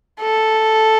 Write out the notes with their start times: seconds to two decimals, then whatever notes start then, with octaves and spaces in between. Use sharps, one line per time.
0.21 A4